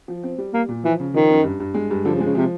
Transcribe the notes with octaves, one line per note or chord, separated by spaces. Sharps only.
F3
C4
G3
G3 A#3
A#2
E3 F3
C#3
D#3 F3
F#2
G2
G2
G#3
G2
D3 F3
C#3
G#3
C#3
C3 F3